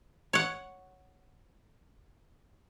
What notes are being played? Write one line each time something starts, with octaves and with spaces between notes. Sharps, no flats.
C#5 F#5